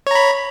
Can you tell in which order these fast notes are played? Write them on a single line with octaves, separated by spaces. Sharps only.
C#5 A#5 B5